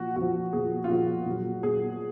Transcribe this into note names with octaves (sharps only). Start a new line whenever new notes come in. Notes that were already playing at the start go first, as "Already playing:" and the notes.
Already playing: A#2 F3 F#4
A#2 F3 F#4
A#2 F3 G#4
F4
A#2 F3 F#4
A#2 F#3
A#2 F#3 G#4